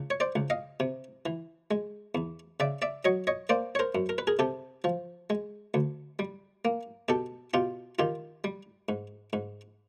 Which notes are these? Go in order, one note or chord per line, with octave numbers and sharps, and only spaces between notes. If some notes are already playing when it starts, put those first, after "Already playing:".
Already playing: C#2
C#5
C5 D5
C#2
D#5 F5
C3
E3
G#3
E2
C#3 D5 E5
D5 E5
F#3 C#5 D#5
C#5 D#5
A#3 C5 D5
C#5
A#4 C5
F#2
A#4
B4
G#4 A#4
C3 G4 A4
F3
G#3
D2
G3
A#3
B2 G4 A4
B2 F4 G4
D#3 F4 G4
G3
G#2
G#2